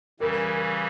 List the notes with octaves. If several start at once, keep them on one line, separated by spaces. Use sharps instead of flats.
C#3 E3 G3 A#4